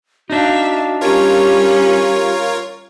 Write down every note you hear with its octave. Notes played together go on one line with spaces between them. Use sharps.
D4 D#4 F#4 E5 F5
G3 C#4 F4 G4 A#4 C#5